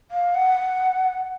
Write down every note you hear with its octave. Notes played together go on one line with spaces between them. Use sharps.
F5
F#5